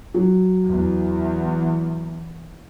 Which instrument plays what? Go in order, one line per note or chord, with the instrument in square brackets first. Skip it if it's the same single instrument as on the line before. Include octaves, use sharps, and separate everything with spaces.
[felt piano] F#3
[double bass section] E2